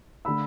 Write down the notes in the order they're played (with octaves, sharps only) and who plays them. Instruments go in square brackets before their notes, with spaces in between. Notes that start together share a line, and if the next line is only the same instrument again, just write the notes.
[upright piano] D3 A3 D4 B5 E6